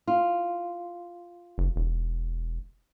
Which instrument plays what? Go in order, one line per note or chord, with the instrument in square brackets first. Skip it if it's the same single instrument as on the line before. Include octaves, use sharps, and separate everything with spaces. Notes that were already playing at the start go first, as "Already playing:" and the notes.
[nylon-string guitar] F4
[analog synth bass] F#1
E1